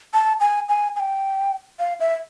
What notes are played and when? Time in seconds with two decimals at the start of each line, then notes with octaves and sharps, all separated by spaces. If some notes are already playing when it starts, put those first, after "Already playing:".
0.14 A5
0.40 G#5
0.69 G#5
0.96 G#5
1.00 G5
1.79 F5
2.00 E5